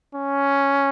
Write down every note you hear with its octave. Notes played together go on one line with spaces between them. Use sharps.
C#4